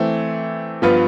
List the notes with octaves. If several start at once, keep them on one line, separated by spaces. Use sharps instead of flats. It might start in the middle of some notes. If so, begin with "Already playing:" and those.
Already playing: E3 A3 C4
G2 F3 B3 F4 B4